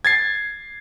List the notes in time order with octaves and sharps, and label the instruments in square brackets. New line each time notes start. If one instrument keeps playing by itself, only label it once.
[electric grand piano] G#6 A6 C7